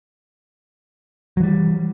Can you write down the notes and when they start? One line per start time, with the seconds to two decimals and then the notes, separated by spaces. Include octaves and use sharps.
1.37 F#3
1.40 E3
1.43 G3